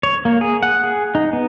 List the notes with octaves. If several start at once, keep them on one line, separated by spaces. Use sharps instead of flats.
C#5
A#3
G#4
F#5
G#4
D#4
B3